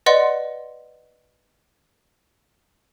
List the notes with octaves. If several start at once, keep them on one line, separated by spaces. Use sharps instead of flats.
B4 D5 D#5 F#5 C6